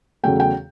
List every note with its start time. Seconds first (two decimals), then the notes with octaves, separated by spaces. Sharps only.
0.23 E2 C#3 F#3 A3 G5
0.40 G5